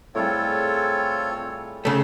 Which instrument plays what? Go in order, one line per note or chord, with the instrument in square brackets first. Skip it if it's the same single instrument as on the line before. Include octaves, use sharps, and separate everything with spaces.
[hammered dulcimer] A2 G3 G#4 [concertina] C4 A4 [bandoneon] F4 C#5
[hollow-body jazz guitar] C#3 A3